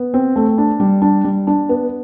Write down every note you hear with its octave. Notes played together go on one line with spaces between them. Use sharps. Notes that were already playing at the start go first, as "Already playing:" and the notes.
Already playing: B3
C4
A3
D4
G3
D4
G3
D4
B3